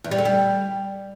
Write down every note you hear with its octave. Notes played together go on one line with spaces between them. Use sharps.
E2
G3
D3
G3